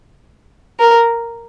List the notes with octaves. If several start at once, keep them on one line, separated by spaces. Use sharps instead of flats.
A#4